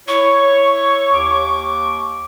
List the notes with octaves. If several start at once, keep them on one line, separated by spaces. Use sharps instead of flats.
E4 C#5 C#6
D#2 D6